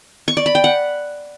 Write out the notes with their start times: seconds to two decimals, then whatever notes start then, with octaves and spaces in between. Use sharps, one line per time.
0.28 C#6
0.37 D5
0.46 B5
0.55 G5
0.64 F#5